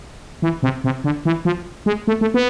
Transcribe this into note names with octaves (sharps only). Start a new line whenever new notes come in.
E3
C3
C3
D3
E3
F3
G#3
A3
A3
B3